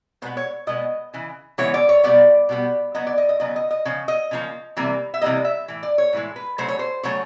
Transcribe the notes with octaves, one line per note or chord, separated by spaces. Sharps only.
B2 G#3 B3 C5
C#5
B2 G#3 B3 D#5
C#3 E3
C#3 E3 G#3 B3 C#5
D5
C#5
B2 G3 B3 D5
B2 G3 B3
C#3 F#3 B3 D#5
D5
D#5
D#5
C#3 F#3 B3 D#5
D#5
D#5
C#3 F3
D#5
C#3 F3 A#3
C3 E3 G3 A#3
E5
C3 E3 G3 A#3 D#5
E5
A2 E3
D5
C#5
A2 E3 G#3
B4
C#3 F#3 A3 C5
C#5
C5
C#3 F#3 A3 C#5